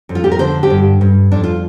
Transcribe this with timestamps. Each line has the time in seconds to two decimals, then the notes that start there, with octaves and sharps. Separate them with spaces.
0.09 F2
0.15 F4
0.24 G4
0.32 A#4
0.39 D3 C5
0.63 G4
0.70 G2
1.01 G2
1.32 F2 D4
1.44 F4